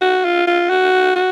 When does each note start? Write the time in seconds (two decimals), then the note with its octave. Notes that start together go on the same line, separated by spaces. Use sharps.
0.01 F#4
0.25 F4
0.47 F4
0.70 F#4
1.16 F#4